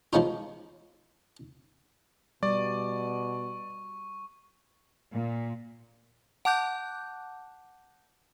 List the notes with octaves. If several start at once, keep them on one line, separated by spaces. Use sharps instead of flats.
F3 G#3 B3 C#4 D#4 F4
B2 G3 D5 C#6
A#2
F#5 A5 D6 F#6 G6